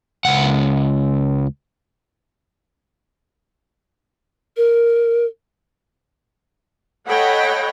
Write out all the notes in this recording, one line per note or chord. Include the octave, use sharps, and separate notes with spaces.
C#2 F#5
A#4
A4 C#5 D#5 F#5 G5 B5